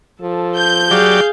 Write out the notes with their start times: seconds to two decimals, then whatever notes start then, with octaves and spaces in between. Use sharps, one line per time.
0.22 F3 A4
0.57 G6
0.91 F#3 G4 G#4 D5 F5